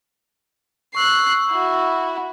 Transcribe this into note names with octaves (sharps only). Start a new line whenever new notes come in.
C#6 E6 F#6 C7
E4 F#4